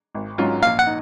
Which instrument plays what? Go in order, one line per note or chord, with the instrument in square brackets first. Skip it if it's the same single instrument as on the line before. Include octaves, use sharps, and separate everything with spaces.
[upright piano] G#1
G#2 F#3 C#4 F4
[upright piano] A#1 [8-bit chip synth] F5
[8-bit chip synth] F#5
[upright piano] D#4